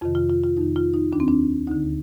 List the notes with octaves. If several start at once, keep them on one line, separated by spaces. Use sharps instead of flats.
F2 C3 D#3 F4
F4
F4
F4
F2 D#3 D#4
F4
D#4
D#2 D#3 C4 D4
D4
D2 D3 D#4